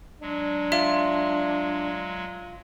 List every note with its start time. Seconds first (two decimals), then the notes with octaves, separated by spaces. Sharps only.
0.21 F#3 G#3 D4
0.72 F4 E5